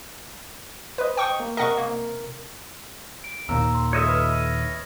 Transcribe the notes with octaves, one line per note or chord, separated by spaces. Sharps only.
B4 C5 D#5
G5 C#6 D#6
A#3
C3 A#4 D#5 F#5 C#6
A#3
D7
D#2 A#2 D#3 A#5 E6
C6
F4 A4 C#5 D#5 E5
B4 B5 F6